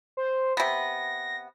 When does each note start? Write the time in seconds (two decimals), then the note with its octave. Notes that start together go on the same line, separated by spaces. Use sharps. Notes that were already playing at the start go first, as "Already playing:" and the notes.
0.17 C5
0.57 C3 B3 A#6